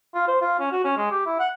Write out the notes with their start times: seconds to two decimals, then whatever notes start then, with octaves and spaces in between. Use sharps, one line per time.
0.15 F4
0.28 C5
0.41 F4
0.59 C#4
0.72 F#4
0.84 C#4
0.97 G#3
1.11 G4
1.26 E4
1.40 F#5